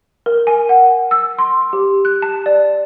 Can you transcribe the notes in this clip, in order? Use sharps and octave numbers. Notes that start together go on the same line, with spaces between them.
A#4
G#5
F#5
E6
C6
G4
F#6
A5
D5